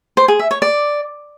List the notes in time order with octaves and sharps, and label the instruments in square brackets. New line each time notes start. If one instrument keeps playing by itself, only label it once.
[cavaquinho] C5
G#4
E5
C#5
D5